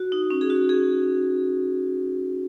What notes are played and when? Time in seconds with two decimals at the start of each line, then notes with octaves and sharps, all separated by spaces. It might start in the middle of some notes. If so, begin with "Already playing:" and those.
Already playing: F#4
0.12 D#4
0.30 C#4
0.41 G#4
0.50 F#4
0.69 G#4